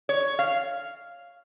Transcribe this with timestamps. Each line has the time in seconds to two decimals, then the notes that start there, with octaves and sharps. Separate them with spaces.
0.09 C#5
0.39 F5